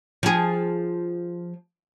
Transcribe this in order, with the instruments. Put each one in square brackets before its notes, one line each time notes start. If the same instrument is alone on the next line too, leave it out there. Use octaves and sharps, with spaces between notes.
[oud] F3 G#4